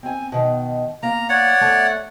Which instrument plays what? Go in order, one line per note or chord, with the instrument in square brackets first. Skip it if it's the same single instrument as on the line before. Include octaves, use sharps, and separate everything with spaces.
[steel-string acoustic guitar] C4 G#5
B2 D#3
[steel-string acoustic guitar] A#3 F5 [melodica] A#5
[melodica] C#5 D5 F#5
[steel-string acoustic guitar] A3 E5